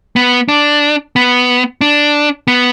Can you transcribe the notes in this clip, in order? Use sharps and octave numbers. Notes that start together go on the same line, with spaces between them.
B3
D4
B3
D4
B3